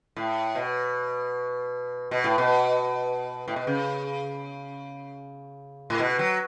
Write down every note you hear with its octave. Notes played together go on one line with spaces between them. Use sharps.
A2
B2
B2
A2
B2
A2
B2
C#3
A2
B2
F#3